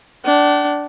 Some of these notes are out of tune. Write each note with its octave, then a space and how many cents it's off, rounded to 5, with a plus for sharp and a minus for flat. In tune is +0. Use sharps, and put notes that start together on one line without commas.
D4 -10 F#5 +45